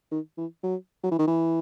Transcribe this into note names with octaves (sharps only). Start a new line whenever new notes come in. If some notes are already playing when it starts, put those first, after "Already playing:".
D#3
E3
F#3
F#3
E3
D#3
E3